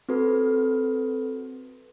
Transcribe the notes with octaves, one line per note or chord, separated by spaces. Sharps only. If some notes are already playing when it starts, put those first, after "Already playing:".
C4 F#4 A4 B4